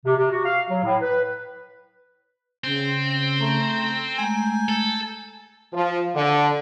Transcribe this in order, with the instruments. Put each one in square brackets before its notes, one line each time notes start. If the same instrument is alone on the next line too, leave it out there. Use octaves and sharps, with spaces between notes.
[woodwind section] C3
C3
F#4
F5
F#3
A2
B4
[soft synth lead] C#3 [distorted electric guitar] C4
[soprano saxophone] A3 [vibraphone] A#5
[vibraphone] G#3 A3 A#5 [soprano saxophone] G#5 [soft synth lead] G6
[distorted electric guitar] A4
[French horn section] F3
D3